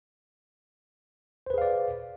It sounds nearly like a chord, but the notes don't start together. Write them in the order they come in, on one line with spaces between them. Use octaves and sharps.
C5 B4 G#4 F5 D5